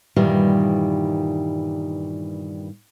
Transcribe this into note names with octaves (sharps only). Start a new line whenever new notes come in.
G2 A#2 D#3 E3 G3